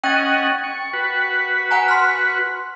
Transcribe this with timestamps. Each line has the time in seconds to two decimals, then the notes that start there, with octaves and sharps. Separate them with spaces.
0.04 C#4 D#5 F#5 G5 A6
0.64 C#6
0.93 F#4 B4
1.71 F#5 G#5 A#5
1.88 C6 F6